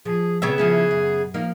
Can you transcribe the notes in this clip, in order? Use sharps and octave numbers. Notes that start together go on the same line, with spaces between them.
F3 G#4
C#3 B3 C4 B4 C#5 E5
F3 C#4 E4 G#4
F#2
F3 A#3 D#4